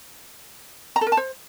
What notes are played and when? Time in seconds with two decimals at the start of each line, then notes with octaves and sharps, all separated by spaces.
0.96 A#5
1.01 A4
1.07 A#4
1.12 A5
1.17 C5